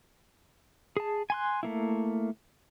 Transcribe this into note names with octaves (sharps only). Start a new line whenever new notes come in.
G#4 A5
G#5 C6 F#6
A3 A#3 E4